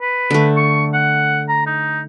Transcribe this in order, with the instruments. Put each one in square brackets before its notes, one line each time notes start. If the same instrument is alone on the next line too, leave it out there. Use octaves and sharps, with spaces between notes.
[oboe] B4
[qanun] D3 A3
[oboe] C#6
F#5
A#5
D#4